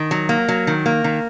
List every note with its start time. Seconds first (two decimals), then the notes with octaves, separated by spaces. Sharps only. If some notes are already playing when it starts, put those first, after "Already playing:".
Already playing: D#3
0.11 F#3
0.29 A#3
0.48 F#3
0.67 D#3
0.86 A#3
1.04 D#3